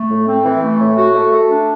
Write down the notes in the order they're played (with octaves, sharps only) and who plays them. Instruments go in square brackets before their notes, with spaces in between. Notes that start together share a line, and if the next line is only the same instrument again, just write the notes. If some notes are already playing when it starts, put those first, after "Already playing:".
Already playing: [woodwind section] A3
A2
C4
E3
A3
A2
F#4
A3
A3
D4